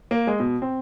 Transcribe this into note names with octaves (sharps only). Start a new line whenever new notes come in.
A#3
G#3
B2
C4